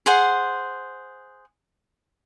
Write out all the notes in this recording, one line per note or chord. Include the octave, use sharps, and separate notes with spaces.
G#4 C5 F#5